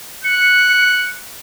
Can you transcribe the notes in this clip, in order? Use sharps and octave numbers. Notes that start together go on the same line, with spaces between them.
F#6 C#7